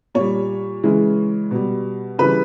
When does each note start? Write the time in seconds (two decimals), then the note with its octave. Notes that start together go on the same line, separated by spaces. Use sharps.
0.15 A#2 G3 C#5
0.84 C#3 E3 G#3
1.51 B2 G3
2.19 C#3 E3 G3 B4